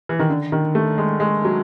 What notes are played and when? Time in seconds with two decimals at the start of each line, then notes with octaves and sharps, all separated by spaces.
0.09 E3
0.19 D#3
0.30 D3
0.52 D#3
0.75 A3
0.98 G#3
1.20 G#3
1.45 F#3